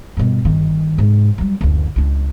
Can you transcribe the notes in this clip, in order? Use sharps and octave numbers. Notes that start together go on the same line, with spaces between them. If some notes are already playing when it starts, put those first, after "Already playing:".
G2 B2
G1 D#3
G#2 C3
F#3 G3
F#1 D2
C#2 D4